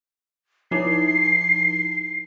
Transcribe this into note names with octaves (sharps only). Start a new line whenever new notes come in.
F3 D#4 E4 C7